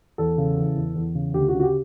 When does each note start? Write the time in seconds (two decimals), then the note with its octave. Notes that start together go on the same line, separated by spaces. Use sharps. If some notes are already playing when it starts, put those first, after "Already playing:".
0.18 E2 A4
0.38 C#3
0.58 E3
0.76 E2
0.95 E2
1.15 C#3
1.34 D2 G4
1.48 F#4
1.54 C#3
1.59 F#4
1.63 G4